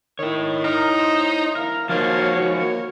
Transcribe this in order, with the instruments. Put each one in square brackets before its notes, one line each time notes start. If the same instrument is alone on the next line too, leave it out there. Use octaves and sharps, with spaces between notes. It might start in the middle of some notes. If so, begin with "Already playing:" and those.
[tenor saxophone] D#3 [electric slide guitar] E4 C#5
[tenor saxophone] D#4 [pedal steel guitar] A#4
[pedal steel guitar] C5
[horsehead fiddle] E4 F5 [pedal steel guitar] A#4
[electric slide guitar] F3 D#4 C5 [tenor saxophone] A#3 [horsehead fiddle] F#4 C#5 [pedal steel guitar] F5 A5
[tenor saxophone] A#3